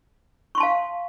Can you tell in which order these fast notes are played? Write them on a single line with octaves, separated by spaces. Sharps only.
C#6 C6 A5 F5